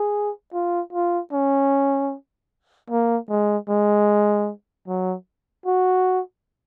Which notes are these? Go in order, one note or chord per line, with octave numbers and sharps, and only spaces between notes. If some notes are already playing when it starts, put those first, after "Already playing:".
Already playing: G#4
F4
F4
C#4
A#3
G#3
G#3
F#3
F#4